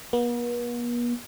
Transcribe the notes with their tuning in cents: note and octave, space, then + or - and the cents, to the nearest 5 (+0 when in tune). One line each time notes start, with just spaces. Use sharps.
B3 -45